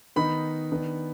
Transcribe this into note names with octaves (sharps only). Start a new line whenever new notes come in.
D#3 B3 D#4 B5
D#3 B3 D4